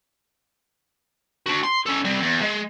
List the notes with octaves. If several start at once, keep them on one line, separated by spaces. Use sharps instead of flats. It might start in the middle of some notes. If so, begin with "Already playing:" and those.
D4 F#4
C6
C#4 A4
G3 C4
E2
G#3